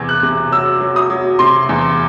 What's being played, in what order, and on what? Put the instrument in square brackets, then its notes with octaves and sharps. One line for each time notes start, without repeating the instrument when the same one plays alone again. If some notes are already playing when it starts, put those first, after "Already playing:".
Already playing: [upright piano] E2 C3 G#6
F#6
C3
F#3 E6
F#3
D#6
F#3
C3 C6
E2